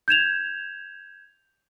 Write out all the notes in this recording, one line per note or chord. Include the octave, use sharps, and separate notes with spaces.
G6 G#6 E7 F7